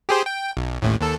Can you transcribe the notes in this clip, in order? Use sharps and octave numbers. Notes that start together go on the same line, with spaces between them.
G4 G#4 C5
G5
B1
A1 D#2 A2
D#2 A4